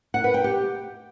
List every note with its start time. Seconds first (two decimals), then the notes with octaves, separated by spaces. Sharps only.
0.14 F#5
0.24 B4
0.34 G5
0.44 G4